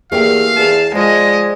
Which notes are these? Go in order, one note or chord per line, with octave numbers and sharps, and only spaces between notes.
E2 A3 A#3 G4 F5
E2 A5
F3 G#3 D5 D#5